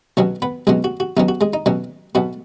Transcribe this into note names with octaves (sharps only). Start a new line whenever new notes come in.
B1 B2 F#3 C#4 C#5
B3 B4
B1 B2 F#3 G#3 C#4 G#4
F#4
F#4
B1 B2 F#3 C#4 D#4
F#4
G#3 G#4
D#4
B1 B2 F#3 C#4
B1 B2 B3 F#4